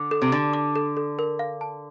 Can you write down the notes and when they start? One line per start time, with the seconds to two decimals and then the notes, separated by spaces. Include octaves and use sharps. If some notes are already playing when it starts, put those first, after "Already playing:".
Already playing: D3
0.11 A4
0.22 C3
0.32 D3 D6
0.53 D6
0.76 A4
0.97 A4
1.19 A#4
1.39 F5
1.61 A5